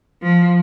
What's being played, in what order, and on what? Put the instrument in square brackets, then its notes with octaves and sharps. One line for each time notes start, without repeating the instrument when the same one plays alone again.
[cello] F3